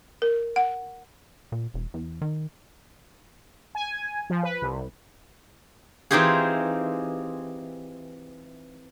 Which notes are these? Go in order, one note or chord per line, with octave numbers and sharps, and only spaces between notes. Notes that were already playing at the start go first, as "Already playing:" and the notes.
A#4
F#5
A#2
E1
E2
D#3
G#5
F3
B4
C2
E3 C4 D#4 F4 G4 G#4